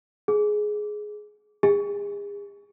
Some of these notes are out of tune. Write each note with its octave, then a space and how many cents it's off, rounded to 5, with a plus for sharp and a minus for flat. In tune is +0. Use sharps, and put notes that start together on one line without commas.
G#4 +15
G#4 -35